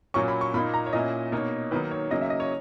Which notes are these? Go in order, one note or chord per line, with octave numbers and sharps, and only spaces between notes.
A#2 F#3 A#3 C#4 C#6
B5
C#6
A#2 A#3 D#4 B5
A#5
C#5
A#2 A#3 C#4 E4 D#5
B2 A#3 D#4 C#5
D#3 F#3 A#3 D#4 B4
C#5
C#3 F#3 A#3 D#5
E5
D#5
C#5